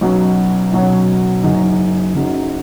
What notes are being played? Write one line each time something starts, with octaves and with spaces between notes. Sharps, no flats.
B1 B2 F#3 C#4
B1 B2 F#3 C#4
F#1 F#2 C#3 F#3 D#4
F#1 F#2 C#3 F#3 D#4